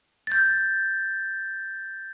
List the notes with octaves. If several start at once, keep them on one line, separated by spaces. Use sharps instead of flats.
G6 A6